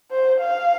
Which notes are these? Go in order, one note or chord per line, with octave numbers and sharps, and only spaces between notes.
C5
F5